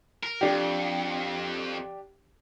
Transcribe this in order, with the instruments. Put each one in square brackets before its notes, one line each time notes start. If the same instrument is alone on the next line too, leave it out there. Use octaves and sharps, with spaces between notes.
[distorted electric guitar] A#4
[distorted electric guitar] F2 [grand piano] D4 G4